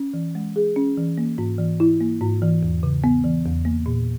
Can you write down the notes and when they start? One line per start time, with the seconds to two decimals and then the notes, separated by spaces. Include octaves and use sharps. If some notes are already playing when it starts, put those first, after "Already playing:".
Already playing: C#4
0.14 E3
0.35 G#3
0.56 G#4
0.76 C#4
0.97 E3
1.18 A#3
1.38 G#2
1.58 E3
1.80 E4
2.01 A#3
2.21 G#2
2.42 E3
2.63 E2
2.83 C#3
3.04 B3
3.24 E3
3.46 E2
3.65 A#3
3.86 A#2